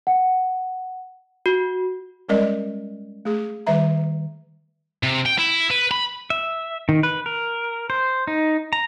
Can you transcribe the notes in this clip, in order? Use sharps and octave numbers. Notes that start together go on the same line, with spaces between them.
F#5
F#4
G3 G#3 C#4 A#4 D5 D#5
A3 G#4
D#3 G3 B4 E5 A#5
C3
G5
E4
B4
B5
E5
D#3
B4
A#4
C5
D#4
A#5